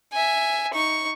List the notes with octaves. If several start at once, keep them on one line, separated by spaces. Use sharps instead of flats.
E5 G#5
D#4 C#6